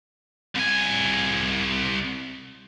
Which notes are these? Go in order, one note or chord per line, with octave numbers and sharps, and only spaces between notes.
C2 G#5